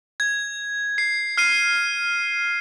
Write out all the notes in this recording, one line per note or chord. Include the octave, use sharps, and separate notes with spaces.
G#6
C7
F6 C7 D#7